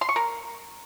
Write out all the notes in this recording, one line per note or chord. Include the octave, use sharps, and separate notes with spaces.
C6
C#6
A#4